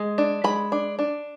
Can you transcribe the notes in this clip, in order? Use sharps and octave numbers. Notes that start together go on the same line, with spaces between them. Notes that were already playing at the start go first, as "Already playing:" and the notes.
Already playing: G#3
D4
G#3 B5
D4
D4